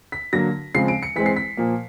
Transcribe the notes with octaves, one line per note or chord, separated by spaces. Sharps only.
B6
D3 F#3 A#3 A#6
C#3 F3 G#3 C4 C7
D7
C#7
E3 G#3 C4 B6
C7
B6
A#2 F3 A#3